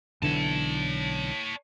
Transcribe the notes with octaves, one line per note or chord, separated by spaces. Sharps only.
B1 D3 E3 C#5 A5